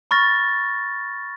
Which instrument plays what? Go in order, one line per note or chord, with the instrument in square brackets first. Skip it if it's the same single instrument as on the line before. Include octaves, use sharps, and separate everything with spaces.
[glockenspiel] B5 C#6 F6 A6 A#6